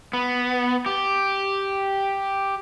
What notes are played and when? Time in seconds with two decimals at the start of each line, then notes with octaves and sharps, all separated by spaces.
0.13 B3
0.86 G4